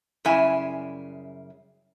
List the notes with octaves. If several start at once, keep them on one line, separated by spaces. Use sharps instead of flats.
F#2 C#3 G3 E4 E5 G#5